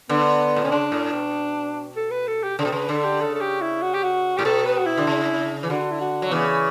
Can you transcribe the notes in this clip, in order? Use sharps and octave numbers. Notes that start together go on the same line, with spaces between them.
D3 B3
A2
B2 C#4
C#3 D4
A2
B2
A4
B4
A4
G4
C#3 A4
B2
C#3 B4
D3 A4
G4
C#3 A4
A4
G4
E4
F#4
G4
F#4
A2 G4
B2 A4
B4
F#4
E4
D3
C#3
E3
D3 F#4
E4
F#4
F#3
C#3 E3 B3